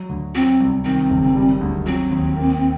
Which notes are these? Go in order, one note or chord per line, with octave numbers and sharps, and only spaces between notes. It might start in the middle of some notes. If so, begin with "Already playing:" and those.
Already playing: F#3
D2
F#3 C4
C2
D#3 C4
F#1
G3
D2
F#3 C4
D#2
A#3